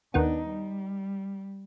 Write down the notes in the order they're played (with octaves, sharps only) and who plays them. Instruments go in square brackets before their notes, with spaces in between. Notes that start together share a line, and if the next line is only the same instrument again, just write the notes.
[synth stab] D#2 D#3 B3 [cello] D4 D#4
[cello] G3